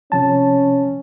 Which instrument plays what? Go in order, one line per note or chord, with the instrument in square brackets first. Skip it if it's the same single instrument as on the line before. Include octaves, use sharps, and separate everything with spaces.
[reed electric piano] C3 F3 A5 [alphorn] C#4